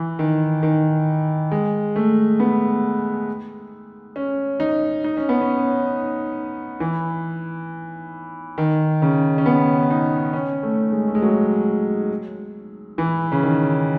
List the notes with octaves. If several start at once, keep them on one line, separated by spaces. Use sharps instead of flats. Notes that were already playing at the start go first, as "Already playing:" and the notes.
Already playing: E3
D#3
D#3
G#3
A3
B3
C#4
D#4
D#4
C#4
B3
C#4
E3
D#3
C#3
C#4
B3
D#4
C#4
A3
G#3
A3
G#3
F#3
E3
C#3
D#3